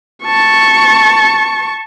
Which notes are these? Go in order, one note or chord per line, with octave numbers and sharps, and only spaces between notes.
A5 C#6